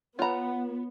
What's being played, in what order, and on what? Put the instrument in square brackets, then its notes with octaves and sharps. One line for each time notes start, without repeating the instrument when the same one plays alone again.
[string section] B3 [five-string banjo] F4 A#5 [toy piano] C#5 B5 [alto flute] F#5